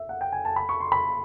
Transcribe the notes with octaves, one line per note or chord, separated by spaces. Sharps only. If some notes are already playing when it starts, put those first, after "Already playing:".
Already playing: E5
F#5
G5
G#5
A5
B5
C#6
C6
B5